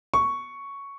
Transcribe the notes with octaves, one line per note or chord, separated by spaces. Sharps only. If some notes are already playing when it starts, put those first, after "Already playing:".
C#6